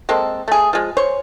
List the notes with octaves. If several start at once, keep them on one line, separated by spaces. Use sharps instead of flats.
G#3 A#3 C4 A4
A3 G#4
F3 G#3
C5 C#5